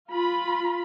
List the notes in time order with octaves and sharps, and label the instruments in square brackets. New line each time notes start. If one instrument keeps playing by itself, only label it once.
[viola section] F4 B5